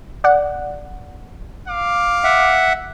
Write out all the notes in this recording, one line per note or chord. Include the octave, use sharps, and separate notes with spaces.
D5 F#5
F5 D6
E5 F#5